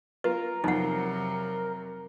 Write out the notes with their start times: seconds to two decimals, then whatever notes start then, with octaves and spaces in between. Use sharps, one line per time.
0.24 F4 A#4 B4
0.64 F2 C3 F#3 D#4 F#5